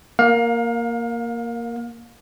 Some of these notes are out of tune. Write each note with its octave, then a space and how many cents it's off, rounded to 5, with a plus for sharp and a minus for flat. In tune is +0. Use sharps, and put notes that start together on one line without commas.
A#3 +0 F5 +30